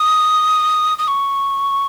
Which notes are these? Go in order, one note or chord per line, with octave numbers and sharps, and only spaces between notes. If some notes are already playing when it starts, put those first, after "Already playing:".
Already playing: D#6
D#6
C#6